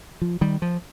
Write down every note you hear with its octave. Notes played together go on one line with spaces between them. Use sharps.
F3
D#3 G3
F3